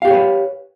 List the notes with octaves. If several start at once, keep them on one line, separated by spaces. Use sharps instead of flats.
G4 G#4 B4 C#5 F5